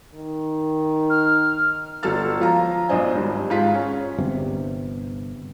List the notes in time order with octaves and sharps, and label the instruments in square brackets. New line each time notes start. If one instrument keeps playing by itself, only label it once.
[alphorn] D#3
[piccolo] F6
[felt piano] G1 F#3 A4 E6 F6 A6
F3 F4 A#5
B1 D4 C5 D#5 G#5
G#1 G2
G#2 F4 B6
C#4
[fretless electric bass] G1 G2 C3